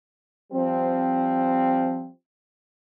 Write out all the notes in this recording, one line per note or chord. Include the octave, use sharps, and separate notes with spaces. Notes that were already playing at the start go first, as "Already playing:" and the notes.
F3 G3 C4